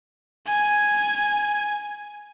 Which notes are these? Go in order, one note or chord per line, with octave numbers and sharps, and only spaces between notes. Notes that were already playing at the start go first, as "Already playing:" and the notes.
G#5 G#6